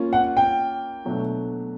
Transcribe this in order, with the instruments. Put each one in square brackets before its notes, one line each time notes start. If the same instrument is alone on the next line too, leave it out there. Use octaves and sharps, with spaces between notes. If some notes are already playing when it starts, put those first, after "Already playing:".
Already playing: [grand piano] A#3 C#4 F4
[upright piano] F#5
G5
[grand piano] B2 F#3 A3 D4